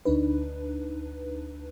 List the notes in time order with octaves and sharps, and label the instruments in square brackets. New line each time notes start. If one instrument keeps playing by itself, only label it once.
[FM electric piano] D2 D4 D#4 B4